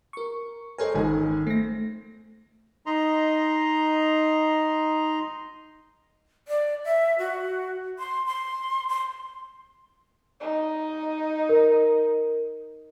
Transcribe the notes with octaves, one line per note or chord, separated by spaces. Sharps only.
A#4 C#6
A4 A#4 C5 C#5 D#5 G#5
G#1 C#2 D#3 G#5
A3 C5 A#6
D#4 D#5 A#5 C6
D5
E5
F#4
C6
C6
C6
D#4
A#4